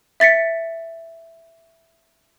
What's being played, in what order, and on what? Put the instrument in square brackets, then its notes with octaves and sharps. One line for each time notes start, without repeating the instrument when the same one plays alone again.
[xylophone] E5 A6 B6 C#7